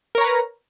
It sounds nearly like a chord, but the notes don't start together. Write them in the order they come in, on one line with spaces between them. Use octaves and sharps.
A#4 C#5 A#5 B4